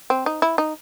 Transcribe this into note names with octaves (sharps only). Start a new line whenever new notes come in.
C4
D#4
E4
D#4